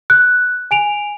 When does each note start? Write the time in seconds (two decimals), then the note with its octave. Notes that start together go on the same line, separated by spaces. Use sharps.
0.10 F#6
0.71 G#5 D7 F7